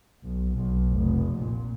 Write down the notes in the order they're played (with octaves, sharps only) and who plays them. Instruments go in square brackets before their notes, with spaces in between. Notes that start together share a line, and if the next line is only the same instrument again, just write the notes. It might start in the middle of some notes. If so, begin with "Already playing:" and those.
[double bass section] B1
B1
F1
A#2